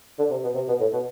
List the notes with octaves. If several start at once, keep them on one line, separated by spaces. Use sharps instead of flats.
D3
C3
B2
C3
B2
A2
B2